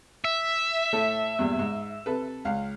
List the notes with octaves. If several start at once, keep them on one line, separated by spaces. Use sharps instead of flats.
E5
A2 A4
E2 G2 A#2
G#2
C3 A4 B4
C#2 F5